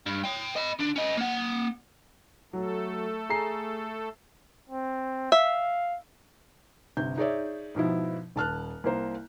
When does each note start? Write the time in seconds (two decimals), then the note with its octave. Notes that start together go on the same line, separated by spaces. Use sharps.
0.06 G2
0.24 C#5 G5
0.56 D#5 B5
0.79 D3 D4
0.96 C#4 D#5
1.17 A#3 F#5
2.53 F#3 A3 A4
3.29 G#4 A#5 C7
4.70 C4
5.32 E5 F5
6.97 G1 C3 G6
7.17 D#4 G#4 C#5 D5 E5
7.75 G#2 B2 F3 E4
8.36 D#1 A5 F6 F#6
8.84 C2 A#3 C5